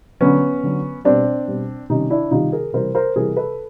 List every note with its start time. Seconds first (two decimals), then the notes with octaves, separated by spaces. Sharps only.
0.21 D3 F#3 B3 C#4
0.63 D3 F#3
1.05 B2 G3 C4 D4
1.48 B2 G3
1.89 C3 D#3 G3 C#4 D#4
2.10 D4 E4
2.31 C3 D#3 G3 D#4 F4
2.53 G#4 A#4
2.73 C3 E3 G3 A#4 C5
2.95 A#4 C5
3.16 C3 E3 G3 G#4 A#4
3.37 A4 B4